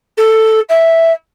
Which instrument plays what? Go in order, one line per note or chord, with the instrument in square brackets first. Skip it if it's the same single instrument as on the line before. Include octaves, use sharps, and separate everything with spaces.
[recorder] A4
E5